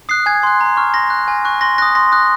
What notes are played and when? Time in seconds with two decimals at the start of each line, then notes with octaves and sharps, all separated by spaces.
0.09 D#6 F#6 C7
0.26 G#5 G#6
0.43 C6 F#6
0.61 A#5
0.77 C#6 F6
0.94 C6 A#6
1.10 F#6
1.28 G#5
1.45 C#6 F#6
1.61 C6 A#6
1.78 D#6 F#6 A#6
1.95 C6 A#6
2.12 D#6 F#6